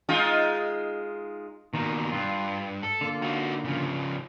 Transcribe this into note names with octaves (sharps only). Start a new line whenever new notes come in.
G#3 D#4 F4
B2 D#3 A#3 D#4
G2 F4
A4
D3 A#3 F4
D#4 F#4
C#3 F3